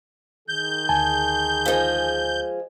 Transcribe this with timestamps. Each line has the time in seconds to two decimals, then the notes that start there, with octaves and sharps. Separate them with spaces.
0.49 D#3 G#4 G6
0.89 D2 G#5 A5
1.66 F3 G#3